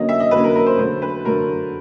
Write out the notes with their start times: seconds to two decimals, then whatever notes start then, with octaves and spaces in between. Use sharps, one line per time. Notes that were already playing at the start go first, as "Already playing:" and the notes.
Already playing: D3 F#3 A#3 C#4 D#5
0.09 E5
0.20 D#5
0.31 D3 F#3 A#3 C#4 B4
0.44 A#4
0.56 A#4
0.66 C5
0.78 D3 F#3 A3 C5
1.02 B4
1.25 D3 F#3 A3 A#4